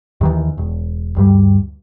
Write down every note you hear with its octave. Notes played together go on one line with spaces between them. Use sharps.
D#2 D#3 E3
E1
D2 G2 G3